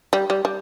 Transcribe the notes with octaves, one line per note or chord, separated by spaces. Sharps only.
G3
G3
G3